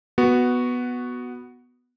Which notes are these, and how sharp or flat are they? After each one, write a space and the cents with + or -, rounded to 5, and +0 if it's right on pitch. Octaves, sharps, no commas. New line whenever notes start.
B3 +0 F#4 +0